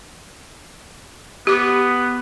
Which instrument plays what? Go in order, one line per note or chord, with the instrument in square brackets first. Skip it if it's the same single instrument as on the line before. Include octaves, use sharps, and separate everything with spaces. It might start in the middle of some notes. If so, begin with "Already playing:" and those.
[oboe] B3 [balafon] G4 D6